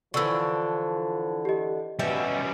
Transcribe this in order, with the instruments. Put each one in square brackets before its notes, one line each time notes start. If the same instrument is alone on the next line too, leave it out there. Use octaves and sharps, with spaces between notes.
[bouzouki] D3 E3 [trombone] F3 [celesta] C#6 E6
[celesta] G4 D#5
[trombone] B2 [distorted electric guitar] G3 C#4 [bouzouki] E5